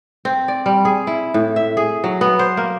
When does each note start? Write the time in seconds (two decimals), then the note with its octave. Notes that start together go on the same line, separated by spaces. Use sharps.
0.25 C4
0.48 D5
0.66 G3
0.85 G#4
1.07 E4
1.34 A2
1.56 E5
1.77 G#4
2.04 F#3
2.21 B3
2.39 C5
2.57 A#3